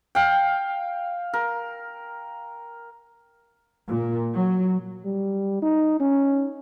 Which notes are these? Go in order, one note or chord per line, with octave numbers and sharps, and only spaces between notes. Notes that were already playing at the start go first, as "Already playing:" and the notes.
F5 G5
A#4
A#2
F#3
G3
D#4
C#4